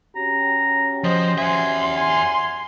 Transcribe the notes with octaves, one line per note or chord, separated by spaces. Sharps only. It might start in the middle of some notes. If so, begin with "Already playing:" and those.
C#4 F#4 G4 A#5
F3 C5 D#5
E5 F#5 G#5 C6
G#5 C6